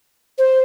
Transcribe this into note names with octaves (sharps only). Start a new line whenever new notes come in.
C5